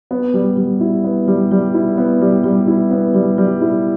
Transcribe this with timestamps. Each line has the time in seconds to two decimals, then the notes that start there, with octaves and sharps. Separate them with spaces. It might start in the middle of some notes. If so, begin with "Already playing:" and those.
0.11 B3
0.34 G3
0.57 G3
0.81 E4
1.04 B3
1.28 G3
1.51 G3
1.74 E4
1.97 B3
2.21 G3
2.44 G3
2.68 E4
2.91 B3
3.14 G3
3.38 G3
3.61 E4